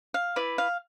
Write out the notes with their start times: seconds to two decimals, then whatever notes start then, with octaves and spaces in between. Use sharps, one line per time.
0.14 F5
0.36 E4 B4 D5
0.58 F5